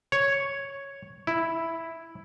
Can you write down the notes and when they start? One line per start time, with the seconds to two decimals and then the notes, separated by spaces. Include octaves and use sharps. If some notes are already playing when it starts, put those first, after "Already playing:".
0.12 C#5
1.27 E4